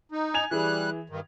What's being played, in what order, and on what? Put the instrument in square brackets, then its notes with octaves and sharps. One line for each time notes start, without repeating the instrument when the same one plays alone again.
[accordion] D#4
[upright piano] G#5 G#6 F7
[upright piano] E3 G#4 [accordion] G3 F#6
[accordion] G2 D#3